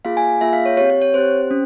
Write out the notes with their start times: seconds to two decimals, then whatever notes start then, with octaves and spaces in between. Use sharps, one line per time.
0.05 A#3 F4 G#4 F5
0.17 G#5
0.41 A#3 F4 G#4 E5
0.53 F5
0.66 C#5
0.77 C4 G4 C#5
0.90 C#5
1.02 C#5
1.14 C4 G4 C5
1.51 C#4